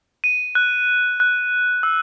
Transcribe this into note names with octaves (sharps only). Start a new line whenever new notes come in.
D#7
F#6
F#6
E6